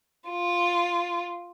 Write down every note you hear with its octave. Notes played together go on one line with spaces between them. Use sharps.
F4